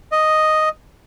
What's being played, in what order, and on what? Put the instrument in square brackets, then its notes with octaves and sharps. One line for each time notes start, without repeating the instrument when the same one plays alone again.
[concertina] D#5